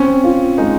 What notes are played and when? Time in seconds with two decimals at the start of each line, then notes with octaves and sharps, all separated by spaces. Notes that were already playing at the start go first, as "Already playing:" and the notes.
Already playing: C4 C#4
0.24 F4
0.58 G#3 D#4